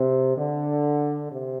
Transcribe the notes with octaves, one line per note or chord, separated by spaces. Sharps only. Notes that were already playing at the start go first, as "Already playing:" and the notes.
Already playing: C3
D3
C3